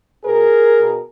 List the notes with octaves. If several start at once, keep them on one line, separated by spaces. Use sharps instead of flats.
B2 G#4 A#4
B2